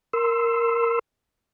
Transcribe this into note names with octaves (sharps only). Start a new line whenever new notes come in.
A#4 C6 E6